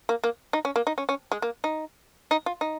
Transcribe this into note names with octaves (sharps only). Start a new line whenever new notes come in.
A#3
A#3
D#4
C#4
A#3
D#4
C#4
C#4
G#3
A#3
D#4
D#4
F4
D#4